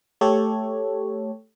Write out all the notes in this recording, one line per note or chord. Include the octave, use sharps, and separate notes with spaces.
A3 G4 A4 C#5